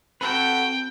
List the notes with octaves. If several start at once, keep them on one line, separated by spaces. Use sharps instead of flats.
C4 F#4 A4 B4 G5